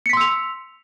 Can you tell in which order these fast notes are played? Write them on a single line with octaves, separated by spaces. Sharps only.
C#7 B6 C6 E6 F7